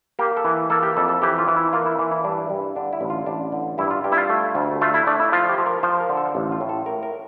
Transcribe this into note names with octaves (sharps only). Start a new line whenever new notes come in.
A#3 G4
A4
E3
A#3 A4
G4
F2 A4
A4
E3 G4
F4
E3
E4
A#3 F4
E4
E3
E4
G2 D4
G2
D3 D4
E4
A1
F4
A1 D4
D3
G2 E4
F4
G2 G4
E4
F4
A3
D2
A3 F4
E4
A3 D4
E4
F3 F4
G4
F3
A#4
F3 C5
A#4
D3
A4
A1
F4
A2
A4
A2 A#4
A#4